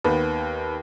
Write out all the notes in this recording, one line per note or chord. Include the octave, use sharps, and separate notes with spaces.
D#2 D#3 B3 B4